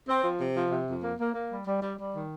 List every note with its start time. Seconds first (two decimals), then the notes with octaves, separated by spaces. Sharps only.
0.08 C4
0.23 F3
0.39 C3
0.56 F3
0.71 C3
0.88 F2
1.04 A#3
1.19 A#3
1.34 A#3
1.50 G3
1.66 G3
1.82 G3
1.99 G3
2.14 D#3